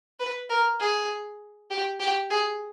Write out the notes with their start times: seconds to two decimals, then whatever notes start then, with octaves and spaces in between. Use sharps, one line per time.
0.19 B4
0.50 A#4
0.80 G#4
1.71 G4
2.00 G4
2.30 G#4